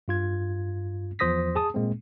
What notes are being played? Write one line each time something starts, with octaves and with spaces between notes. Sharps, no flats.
G2 F4 G#6
E2 F3 C5 D#6 A#6 B6
G#4 A5 D#6
A#2 G#3 A#3 C4